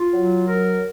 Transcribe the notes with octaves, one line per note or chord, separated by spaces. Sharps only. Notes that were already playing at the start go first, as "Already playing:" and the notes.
Already playing: F4
F#3
A#4